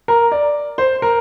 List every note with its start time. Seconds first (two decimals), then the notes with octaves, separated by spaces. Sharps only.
0.08 A#4
0.32 D5
0.78 C5
1.02 A#4